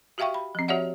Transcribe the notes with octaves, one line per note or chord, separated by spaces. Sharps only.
F#4 G4 E5 F5 G5 C#6
B5
F3 C4
F#4 G4 C#5 D5 E5 F#5